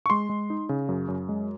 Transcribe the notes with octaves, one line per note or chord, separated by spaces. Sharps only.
C#6
G#3 C6
G#3
D#4
C#3
F#2
F#2
G#3